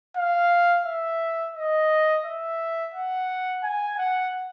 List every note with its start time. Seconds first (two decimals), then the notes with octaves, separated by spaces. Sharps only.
0.17 F5
0.86 E5
1.55 D#5
2.25 E5
2.94 F#5
3.63 G#5
3.98 F#5